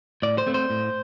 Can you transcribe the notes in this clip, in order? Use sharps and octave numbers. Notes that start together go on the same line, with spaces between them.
A2 D5
C5
A3 C4
C5
A2